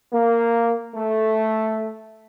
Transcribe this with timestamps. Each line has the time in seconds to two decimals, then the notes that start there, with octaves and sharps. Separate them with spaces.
0.13 A#3
0.94 A3